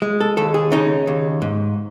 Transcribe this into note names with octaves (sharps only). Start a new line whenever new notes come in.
G#3
A4
D#2 A4
G#4
C#3 D#4
D#2
G#2